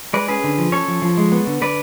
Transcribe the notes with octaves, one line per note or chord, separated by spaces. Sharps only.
G#3 B4 D5
C#4 G#4 B4
D3
F3
C#4 A4 C#5
F3
F3
G#3
B3
D3
D3 B4 D5